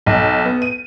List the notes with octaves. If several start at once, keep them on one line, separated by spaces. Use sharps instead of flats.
B1
B3
D#7